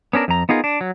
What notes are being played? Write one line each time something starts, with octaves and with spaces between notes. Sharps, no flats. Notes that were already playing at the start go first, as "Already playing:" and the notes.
B3 C#4 D4 A#4
F2 A#5
B3 D#4 F4 G#4 A#4
D4
F#3